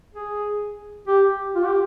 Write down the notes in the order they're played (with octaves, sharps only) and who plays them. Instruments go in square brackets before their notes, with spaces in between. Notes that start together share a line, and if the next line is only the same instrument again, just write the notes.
[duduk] G#4
G4
F4
G4